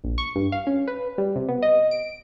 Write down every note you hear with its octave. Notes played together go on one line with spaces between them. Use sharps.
A#1
C#6
G2
F5
C#4
B4
G3
C3
B3
D#5
D7